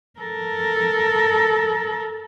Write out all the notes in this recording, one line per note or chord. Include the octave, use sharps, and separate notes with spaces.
A4 A#4